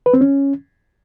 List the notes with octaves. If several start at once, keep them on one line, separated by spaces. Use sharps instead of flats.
B4
C4
C#4